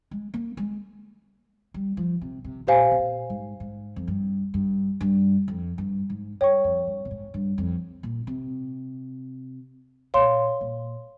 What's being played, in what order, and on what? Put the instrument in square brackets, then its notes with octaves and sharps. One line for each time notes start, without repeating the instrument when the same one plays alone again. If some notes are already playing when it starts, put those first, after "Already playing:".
[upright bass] G#3
A#3
G#3
G3
F3
C3
C3
[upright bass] A#2 [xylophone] G4 C5 F5 G#5
[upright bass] C3
A#2
G#2
G#2
F2
G2
G2
G2
F2
G2
G#2
[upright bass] G2 [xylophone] C#5 G5 C#6
[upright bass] F2
G2
A#2
G#2
G2
F2
A#2
C3
[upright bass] A#2 [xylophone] C#5 F5 C6
[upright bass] A#2